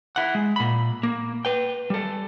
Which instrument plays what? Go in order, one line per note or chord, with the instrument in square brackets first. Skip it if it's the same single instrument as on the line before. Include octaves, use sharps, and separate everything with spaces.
[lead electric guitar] E4 F#5
G#3
A#2 B5
A#3
B4 G5
G3 A4